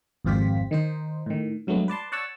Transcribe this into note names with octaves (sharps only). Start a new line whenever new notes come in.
G#1 F2 C4 F4 G4 B6
D#3 D#4 C5
A2 D#3
G2 F#3 G#3 A3 B3
B4 D5 A5 C6
C#5 D5 F#5 A5 C#6 E6